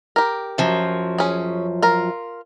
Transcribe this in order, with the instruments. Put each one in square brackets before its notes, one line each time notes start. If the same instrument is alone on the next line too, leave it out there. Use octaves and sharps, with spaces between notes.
[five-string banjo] G4 A#4
[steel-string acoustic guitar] F#2 F3 F#3
[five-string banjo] C#4 G#4
F4 A#4